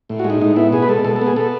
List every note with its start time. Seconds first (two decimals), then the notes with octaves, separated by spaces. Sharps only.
0.09 A2
0.19 F#4
0.24 G#3
0.30 D#4
0.41 A2 D#4
0.56 B3 E4
0.72 B2 G#4
0.82 B4
0.89 G#3 A4
1.05 B2 A4
1.16 A4
1.21 B3
1.27 G#4
1.36 B3 A4